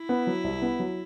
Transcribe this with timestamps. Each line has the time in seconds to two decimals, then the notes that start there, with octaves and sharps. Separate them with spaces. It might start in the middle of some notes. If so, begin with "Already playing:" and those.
Already playing: E4
0.09 B3
0.27 F#3
0.44 C2
0.62 B3
0.79 F#3